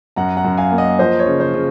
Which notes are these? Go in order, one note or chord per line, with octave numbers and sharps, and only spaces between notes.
F#2 F#5 A#5
F#5 A#5
F#2
F5 G#5
A#3
D#5 F#5
F3 C5 D#5
C#5
C#3
C5
C#3